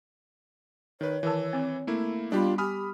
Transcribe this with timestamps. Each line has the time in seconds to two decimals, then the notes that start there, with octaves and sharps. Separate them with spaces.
1.01 D#3 B4 C#5
1.23 D#3 E3 A#4 A5 E6
1.53 C4
1.87 A3 A#3 E4
2.32 G3 B3 D4 F4 G4 B5
2.58 G4 G#5 B5 D#6 F6